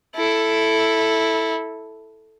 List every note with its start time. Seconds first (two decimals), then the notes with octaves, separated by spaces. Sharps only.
0.16 E4 A4